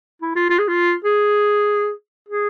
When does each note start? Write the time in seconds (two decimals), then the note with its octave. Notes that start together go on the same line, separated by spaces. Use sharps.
0.22 E4
0.36 F4
0.50 F4
0.59 G#4
0.68 F4
1.05 G#4
2.29 G#4